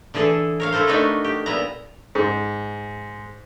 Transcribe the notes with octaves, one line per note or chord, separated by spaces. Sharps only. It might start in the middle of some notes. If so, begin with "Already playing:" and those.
D3 E3 E4 G#4 A4
A#4 C#5 F5
E4 F4 A4 A#4 C5
A3 D4 D#4 F#4 A#4 B4
G4
A#2 B3 E4 A#5
G#2